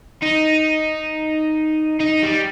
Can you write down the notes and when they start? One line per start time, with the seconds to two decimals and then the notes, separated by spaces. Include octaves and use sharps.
0.22 D#4
2.00 D#4
2.23 G3